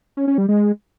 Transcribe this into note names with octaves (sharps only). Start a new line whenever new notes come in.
C#4
C#4
G3
G#3